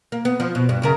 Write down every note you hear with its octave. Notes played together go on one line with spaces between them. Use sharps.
A#3
B3
F3
B2
G2
F#2 C#3 A#4